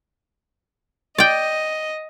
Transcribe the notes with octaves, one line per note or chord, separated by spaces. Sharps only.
D5 D#5 G5